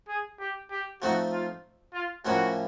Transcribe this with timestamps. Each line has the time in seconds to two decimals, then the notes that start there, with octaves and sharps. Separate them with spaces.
0.08 G#4
0.39 G4
0.70 G4
1.02 F3 A3 C4 D#4 F#4
1.32 F4
1.94 F4
2.25 A2 F3 A#3 C#4 E4 F#4